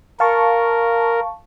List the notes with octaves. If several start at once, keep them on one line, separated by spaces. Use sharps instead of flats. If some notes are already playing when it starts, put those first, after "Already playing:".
A#4 F5 A5 C#6